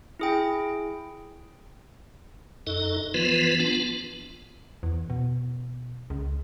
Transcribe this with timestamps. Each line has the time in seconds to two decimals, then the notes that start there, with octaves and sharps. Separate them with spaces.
0.20 E4 G#4 G5
2.67 F#2 D#4 A4 D#5
3.14 E3 F3 B3 F4 B4
3.59 B3 D4 F4
4.83 E2
5.10 B2
6.10 C#2